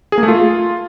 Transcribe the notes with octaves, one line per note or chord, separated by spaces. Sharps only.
G#4
A#3
A3
F4